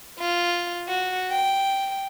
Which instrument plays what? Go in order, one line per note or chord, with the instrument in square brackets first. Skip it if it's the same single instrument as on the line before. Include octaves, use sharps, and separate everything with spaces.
[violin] F4
F#4
G5